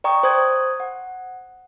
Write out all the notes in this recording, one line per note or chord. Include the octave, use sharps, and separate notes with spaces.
D5 G5 A#5 C#6 D#6
C5 C6 D#6 G#6
F#5